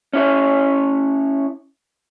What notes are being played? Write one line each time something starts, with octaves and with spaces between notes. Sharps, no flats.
C#4 E4 C#5